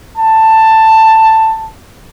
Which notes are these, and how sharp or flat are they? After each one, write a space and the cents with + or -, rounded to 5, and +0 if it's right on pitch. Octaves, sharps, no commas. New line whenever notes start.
A5 +10